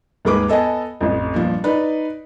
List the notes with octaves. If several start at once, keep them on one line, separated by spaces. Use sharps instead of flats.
D#2 G#2 G#4 B4 D6
B3 A4 D#5 G#5 A5
A1 F2
G2 A#2 F3
D#4 B4 D5